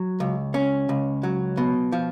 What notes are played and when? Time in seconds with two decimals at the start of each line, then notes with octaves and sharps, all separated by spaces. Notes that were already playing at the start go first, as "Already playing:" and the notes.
Already playing: F#3
0.20 C#2
0.54 C#4
0.89 C#2
1.23 F#3
1.57 B2
1.92 F3